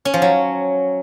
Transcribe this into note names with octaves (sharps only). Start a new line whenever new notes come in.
C#4
F3
F#3